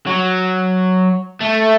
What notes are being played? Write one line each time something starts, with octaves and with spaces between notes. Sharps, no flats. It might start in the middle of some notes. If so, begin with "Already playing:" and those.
F#3
A3